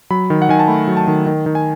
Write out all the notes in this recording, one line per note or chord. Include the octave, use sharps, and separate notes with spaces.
F#3 B5
D#3
F#5
D#3 G#5
A5
A3 B5
F#3
A5
D#3
D#3
D#3
G#5